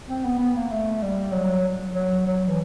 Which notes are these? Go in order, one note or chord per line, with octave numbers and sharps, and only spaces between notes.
C4
B3
B3
A#3
A3
G3
F#3
F#3
F#3
E3